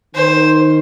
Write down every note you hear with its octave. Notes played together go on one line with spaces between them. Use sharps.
D#3 C5